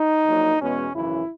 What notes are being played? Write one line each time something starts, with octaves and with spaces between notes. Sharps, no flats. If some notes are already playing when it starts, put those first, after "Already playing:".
Already playing: D#4
A#1 A#2 F#3
E2 B2 G#3 B3 C#4
G#1 F#2 C#3 E3 E4